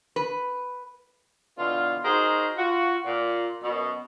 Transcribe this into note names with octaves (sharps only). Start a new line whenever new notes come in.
B4
B2 D3 E3 F4
D#4 F#4 G#4 A#4 C5
F4 F#4
A#2
F#2 B2